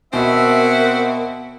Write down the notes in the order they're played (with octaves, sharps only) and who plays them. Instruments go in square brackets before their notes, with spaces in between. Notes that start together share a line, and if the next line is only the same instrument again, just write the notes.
[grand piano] B2 [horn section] C4 F#4 F#5 [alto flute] A#4 [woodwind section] E5